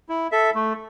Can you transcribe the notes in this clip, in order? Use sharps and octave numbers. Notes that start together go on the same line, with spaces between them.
E4
A4 E5
A3